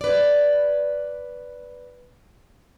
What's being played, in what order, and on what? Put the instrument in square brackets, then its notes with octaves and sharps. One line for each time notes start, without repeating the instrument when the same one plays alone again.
[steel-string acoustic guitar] B4 D5